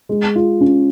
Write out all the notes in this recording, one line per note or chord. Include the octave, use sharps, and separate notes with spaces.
G#3
F4
C#4